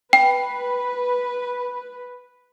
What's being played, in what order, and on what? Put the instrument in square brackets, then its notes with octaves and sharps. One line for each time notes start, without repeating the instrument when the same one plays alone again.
[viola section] B4 [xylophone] G5